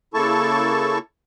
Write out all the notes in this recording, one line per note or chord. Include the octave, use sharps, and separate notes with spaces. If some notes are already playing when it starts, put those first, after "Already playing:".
C#3 A#3 E4 A4 A5 C#6